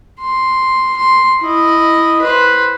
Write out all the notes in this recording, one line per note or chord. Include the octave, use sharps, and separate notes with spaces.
C6
C6
E4 D#5
B4 C5